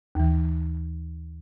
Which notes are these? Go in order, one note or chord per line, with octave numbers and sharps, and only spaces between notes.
D#2 E3